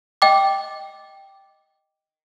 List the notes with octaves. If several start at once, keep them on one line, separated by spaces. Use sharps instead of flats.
D#5 G5 D6